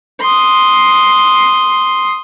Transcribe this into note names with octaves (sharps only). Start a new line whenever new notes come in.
C6 D#6